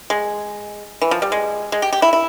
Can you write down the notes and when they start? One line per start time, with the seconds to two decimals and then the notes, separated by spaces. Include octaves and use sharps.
0.10 G#3
1.02 E3
1.11 F3
1.22 G3
1.32 G#3
1.72 G#3
1.82 G4
1.93 G4
2.02 E4
2.13 E4